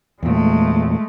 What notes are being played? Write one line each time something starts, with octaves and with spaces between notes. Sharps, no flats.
E2 A#2 G#3 A3